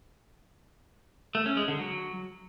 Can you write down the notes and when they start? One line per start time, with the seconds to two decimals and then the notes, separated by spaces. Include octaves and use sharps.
1.35 A3
1.46 C#4
1.57 G#3
1.68 D3
1.79 F#3